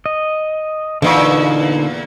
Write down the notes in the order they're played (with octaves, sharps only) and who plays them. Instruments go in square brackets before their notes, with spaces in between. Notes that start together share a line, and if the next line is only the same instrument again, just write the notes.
[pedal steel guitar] D#5
[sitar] E2 A#2 [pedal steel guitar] D3 D#4 C#6